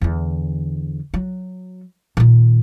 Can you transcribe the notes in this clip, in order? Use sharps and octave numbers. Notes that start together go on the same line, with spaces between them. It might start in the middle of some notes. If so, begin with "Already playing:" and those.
E2 D3
F#3
A#2 D#3